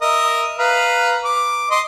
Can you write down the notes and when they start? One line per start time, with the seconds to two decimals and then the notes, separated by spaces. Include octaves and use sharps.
0.01 A#4 D#5 E5
0.59 B4 F5 A#5
1.24 D6
1.71 D#5 C6 D6